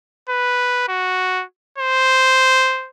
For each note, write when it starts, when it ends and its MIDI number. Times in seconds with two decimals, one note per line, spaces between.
0.29 0.88 71
0.88 1.44 66
1.78 2.89 72